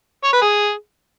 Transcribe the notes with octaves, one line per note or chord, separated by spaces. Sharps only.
C#5
B4
G#4